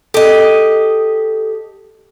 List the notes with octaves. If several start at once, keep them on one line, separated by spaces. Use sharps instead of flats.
G4 A4 D#5